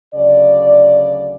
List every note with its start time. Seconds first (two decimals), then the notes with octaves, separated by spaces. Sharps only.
0.13 D2 C#3 F#3 D5